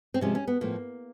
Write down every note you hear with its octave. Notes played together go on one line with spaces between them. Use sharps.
C4
C3 F3 G#3 C#4
C#4
B3
A2 F3 A3 A#3